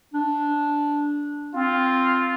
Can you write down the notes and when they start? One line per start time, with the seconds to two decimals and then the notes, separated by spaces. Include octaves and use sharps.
0.14 D4
1.54 C4 F4